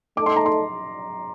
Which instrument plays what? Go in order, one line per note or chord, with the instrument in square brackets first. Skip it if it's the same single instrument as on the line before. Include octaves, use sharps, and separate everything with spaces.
[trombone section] A3 D#4 A4 [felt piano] D6
[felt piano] C6
A#5
C6